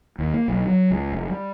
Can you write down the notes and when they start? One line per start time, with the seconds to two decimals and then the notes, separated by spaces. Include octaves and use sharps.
0.19 D#2
0.34 A#3
0.48 B1
0.66 F#3
0.91 C#2
1.12 F1
1.30 G3